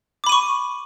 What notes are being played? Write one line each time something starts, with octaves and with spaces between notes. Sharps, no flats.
B5 C#6 D6 D#7